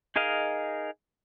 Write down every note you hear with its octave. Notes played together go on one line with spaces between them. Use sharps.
D#4 G#4 A#4 D#5 F5